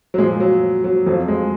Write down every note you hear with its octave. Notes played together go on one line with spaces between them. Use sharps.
F#3
A#2 F3 G#3
F#3
F#3
F2 F3 F#3
G#3